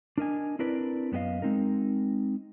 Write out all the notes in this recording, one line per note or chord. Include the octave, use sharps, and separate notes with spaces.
D4 A#4 D#5 G#5
C4 D4 E4 A#4 B4 D5
F#2 B3 C#4 G4 D#5 F5
G#3 C4 D#4 A#4